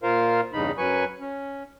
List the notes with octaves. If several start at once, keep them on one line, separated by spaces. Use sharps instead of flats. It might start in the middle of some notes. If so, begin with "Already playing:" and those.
A#2 F4 A#4 C5 F5
E2 G2 C#3 D#4 B5
F#2 F#3 B4 G#5 C#6
C#4